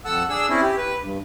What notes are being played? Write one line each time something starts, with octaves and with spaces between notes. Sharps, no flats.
F2 A4 F#5 E6
D4 G#4 E6
C4 C#4 E4
G4
B4
G2